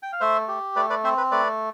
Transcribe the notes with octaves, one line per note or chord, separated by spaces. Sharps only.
G5
F5
A3 C5 E5
G4
A3 B4 D5
B4 D5
C4 C5 E5
B4
A3 B4 D5